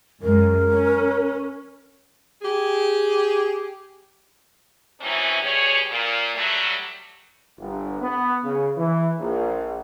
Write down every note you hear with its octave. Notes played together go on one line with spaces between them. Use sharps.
F#2 G#3 A#4
C#4
G4 G#4
E3 F#3 A3 C4 C#4 D#4
B2 G3 G4 G#4 C#5
A#2
F#3 G3 A3
G1
B3
C#3
E3
A#1